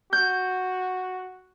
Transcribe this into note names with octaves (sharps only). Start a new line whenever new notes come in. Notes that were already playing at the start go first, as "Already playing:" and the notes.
F#4 G6